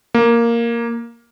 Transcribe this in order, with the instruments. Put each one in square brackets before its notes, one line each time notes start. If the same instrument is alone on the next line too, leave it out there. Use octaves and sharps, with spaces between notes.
[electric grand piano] A#3